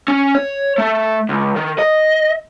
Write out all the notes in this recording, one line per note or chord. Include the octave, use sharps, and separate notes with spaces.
C#4
C#5
A3
C#2
D#3
D#5